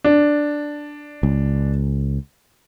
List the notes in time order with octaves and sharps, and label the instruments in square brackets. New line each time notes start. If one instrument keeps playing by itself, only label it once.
[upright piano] D4
[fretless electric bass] C#2